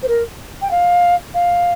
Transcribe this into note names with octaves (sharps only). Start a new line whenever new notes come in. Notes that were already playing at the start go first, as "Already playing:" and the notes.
C5
A#4
G5
F5
F5